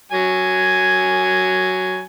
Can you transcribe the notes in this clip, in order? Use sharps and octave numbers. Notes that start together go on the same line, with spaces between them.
F#3 G#5